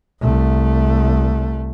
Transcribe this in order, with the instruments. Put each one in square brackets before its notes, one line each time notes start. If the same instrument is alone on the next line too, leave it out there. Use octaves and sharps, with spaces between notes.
[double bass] C2 A3